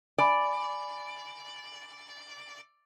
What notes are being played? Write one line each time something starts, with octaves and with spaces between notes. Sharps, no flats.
D5 G#5 B5